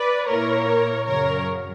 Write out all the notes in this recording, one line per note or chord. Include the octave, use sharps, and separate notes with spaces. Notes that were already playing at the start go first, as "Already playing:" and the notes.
Already playing: B4 D5
A#2 A#3 E4 A#4 C#5
F#2 C#3 F#3 A#4 C#5